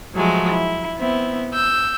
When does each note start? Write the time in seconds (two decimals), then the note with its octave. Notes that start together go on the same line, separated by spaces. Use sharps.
0.16 F3 F#3 G#3 A3
0.51 E4
0.98 B3 C4 E4
1.54 E6 G6